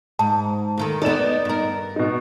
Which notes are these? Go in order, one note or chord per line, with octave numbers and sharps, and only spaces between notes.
G#2 A5
D2 D#3 A4
B3 D#4 A4 D5 E7
G2 A#4
B2 D#4